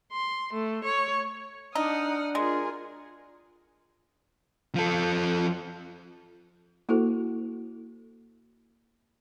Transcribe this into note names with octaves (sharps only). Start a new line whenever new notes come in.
C6
A3
C#5
D4 D#4 F#5 D#6 F6
G#3 F4 G#4 A#4
F3 A4
A#3 E4 F#4 A4 C5